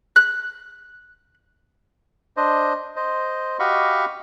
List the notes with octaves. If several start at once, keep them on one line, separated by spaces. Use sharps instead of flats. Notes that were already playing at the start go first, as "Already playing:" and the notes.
F#6
D4 C5 D#5
C5 D#5
F#4 G4 D#5 F5 B5 C#6